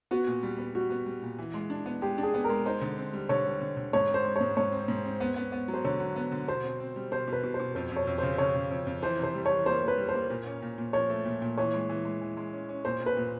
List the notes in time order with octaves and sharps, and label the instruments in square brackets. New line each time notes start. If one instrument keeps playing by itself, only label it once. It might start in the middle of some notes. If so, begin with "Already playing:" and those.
[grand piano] B3 [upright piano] F#4
[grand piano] A#2
G3
B3
[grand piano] G3 [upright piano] F#4
[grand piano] B3
G3
A#2
E3
G#3
D4
B3
[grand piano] G#3 [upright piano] G4
[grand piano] D4
[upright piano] G#4
[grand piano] B3
[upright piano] A#4
[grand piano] G#3
[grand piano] D#4 [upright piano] C5
[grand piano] D3
C4
G3
[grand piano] D3 [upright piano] C#5
[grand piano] G3
D3
D3
[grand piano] G#2 [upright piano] C#5
[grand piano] C4
[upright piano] C5
[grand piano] G#3
[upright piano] C#5
[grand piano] G#2
[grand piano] G#2 [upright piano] C#5
[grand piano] C4
G#2
C4
B3
B3
B3
F#3
[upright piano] C5
[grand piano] D3 [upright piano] C#5
[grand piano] F#3
B3
D3
[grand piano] B2 [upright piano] C5
[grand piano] C4
C4
G3
[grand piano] B2 [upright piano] C5
[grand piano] B2
[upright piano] B4
[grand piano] B2
[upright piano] C5
[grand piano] B2
[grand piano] F2 [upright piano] C5
[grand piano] F2
[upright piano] C#5
[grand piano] F2
[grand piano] C#3 [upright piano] C5
[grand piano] C#3 [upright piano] C#5
[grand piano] C#3
F2
F2
[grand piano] E3 [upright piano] C5
[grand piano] C3 [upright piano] C5
[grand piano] G3
[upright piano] C#5
[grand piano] E3
[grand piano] A#3 [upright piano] C5
[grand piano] A#3
[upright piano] B4
[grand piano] G3
[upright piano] C5
[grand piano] A#3
A#2
C#4
A#2
A#2
[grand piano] F3 [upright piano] C#5
[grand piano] A3
A#2
A#2
[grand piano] E3 [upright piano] C#5
[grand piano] G#3
E3
G#3
E3
G#3
C#4
C#4
[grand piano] A#2 [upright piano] C5
[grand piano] A#2
[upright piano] B4
[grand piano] A#2